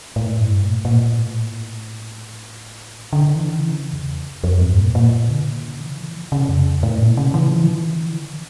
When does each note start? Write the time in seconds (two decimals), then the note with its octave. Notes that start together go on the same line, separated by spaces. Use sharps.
0.16 A2
0.39 G2
0.62 A#2
0.85 A#2
1.19 A2
3.13 D3
3.36 E3
3.59 C#3
3.93 E2
4.44 F2
4.61 G2
4.78 A#2
4.95 A#2
5.30 D3
5.63 C#3
5.80 E3
5.97 F3
6.15 E3
6.32 C#3
6.49 F2
6.83 A2
7.00 A#2
7.17 C#3
7.34 E3
7.51 F3
7.64 D3
7.69 E3
8.03 D3